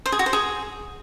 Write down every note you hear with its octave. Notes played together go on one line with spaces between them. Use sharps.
C5
G#4
F#4
C5
G#4